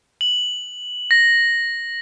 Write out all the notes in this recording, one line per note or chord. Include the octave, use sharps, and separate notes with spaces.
F#7
A#6